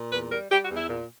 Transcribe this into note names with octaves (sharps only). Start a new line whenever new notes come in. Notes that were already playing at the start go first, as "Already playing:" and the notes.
Already playing: A#2
E2 B4
G3 A#4
G3 G4
F#4
E2
E4
A#2